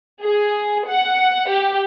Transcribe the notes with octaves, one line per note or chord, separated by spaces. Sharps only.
G#4
F#5
G4